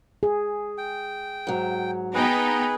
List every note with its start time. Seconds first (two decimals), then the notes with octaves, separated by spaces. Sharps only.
0.23 G#4
0.78 G5
1.47 G#2 F#3
2.14 B3 D#4 G#4 B4 G5